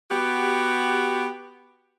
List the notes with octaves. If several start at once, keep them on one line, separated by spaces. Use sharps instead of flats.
B3 F#4 G4